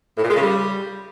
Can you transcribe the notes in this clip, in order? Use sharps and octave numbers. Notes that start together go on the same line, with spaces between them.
A2
A#2
G#3
C#3
G3